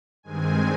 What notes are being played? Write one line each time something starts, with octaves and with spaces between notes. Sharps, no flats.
G2 D#3 G#3 C4 G#5